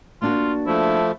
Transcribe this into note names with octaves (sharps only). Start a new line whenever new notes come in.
A#3 D4 F4 F#4
F3 A3 E4